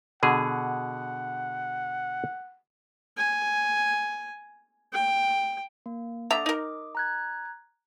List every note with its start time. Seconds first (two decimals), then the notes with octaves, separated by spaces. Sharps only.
0.23 B2 D3 G#4 F#5
3.17 G#5
4.93 G5
5.86 A#3
6.31 D3 E5 A#5 D6 D#6
6.46 D#4 A#4
6.95 A#5 F#6 G#6